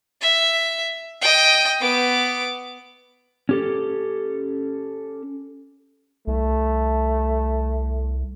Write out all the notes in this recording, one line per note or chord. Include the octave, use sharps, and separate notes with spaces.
E5
D#5 G5
B3 D6
C#4 G4 A4
C2 A3